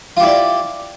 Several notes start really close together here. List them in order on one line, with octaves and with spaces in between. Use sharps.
F4 G4 E4 D5